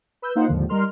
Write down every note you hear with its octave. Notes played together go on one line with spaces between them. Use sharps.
B4 E6 G6
A#3 D#4 F4 C5 F5 F#5
D#2 G#2 D3 D#3 F3
G3 D#4 A#4 C6 F6